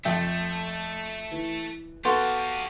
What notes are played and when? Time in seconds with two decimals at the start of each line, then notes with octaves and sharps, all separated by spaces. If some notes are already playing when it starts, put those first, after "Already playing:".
0.05 F2 A3 E5 G5
1.32 E3
2.05 B3 F#4 G4 A4 F5 C6